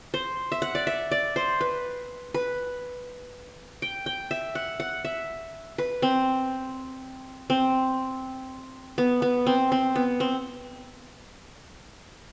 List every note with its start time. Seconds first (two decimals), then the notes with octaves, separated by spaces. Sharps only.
0.14 C5
0.52 E5
0.62 F#5
0.75 D5
0.87 E5
1.11 D5
1.36 C5
1.61 B4
2.34 B4
3.82 G5
4.06 G5
4.31 E5
4.55 F#5
4.80 F#5
5.05 E5
5.78 B4
6.02 C4
7.50 C4
8.98 B3
9.22 B3
9.47 C4
9.72 C4
9.96 B3
10.20 C4